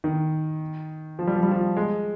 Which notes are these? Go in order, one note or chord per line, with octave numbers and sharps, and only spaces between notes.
D#3
F3
G3
F3
G3
F3
G#3